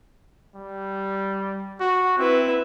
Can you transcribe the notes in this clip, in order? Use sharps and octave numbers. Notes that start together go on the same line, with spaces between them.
G3
F#4
C4 E4 B4